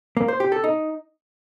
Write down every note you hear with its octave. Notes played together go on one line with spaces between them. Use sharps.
A#3
C5
G4
A4
D#4